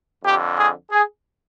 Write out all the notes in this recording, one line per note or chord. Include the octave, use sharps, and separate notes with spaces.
F2 D3 G4
G#4
G#4